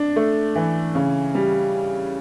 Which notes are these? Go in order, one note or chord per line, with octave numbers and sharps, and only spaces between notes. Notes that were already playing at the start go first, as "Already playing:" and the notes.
Already playing: D4
A3
E3
C#3
G3